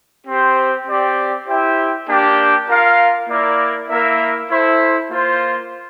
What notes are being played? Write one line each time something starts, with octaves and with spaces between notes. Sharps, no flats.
C4 G4 C5
C4 G4 D5
E4 G4 C5 E5 G5
A#3 D4 G4
F4 A#4 F5
A#3 E4 A#4 D5
A#3 E4 A#4 E5
E4 A4 C5
A#3 F4 C5